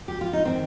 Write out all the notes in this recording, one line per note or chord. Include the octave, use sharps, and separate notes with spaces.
G4
F4
D#4
D#3 C4